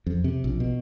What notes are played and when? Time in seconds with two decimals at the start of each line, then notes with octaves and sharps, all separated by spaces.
0.06 F2
0.24 C3
0.44 A#1
0.60 B2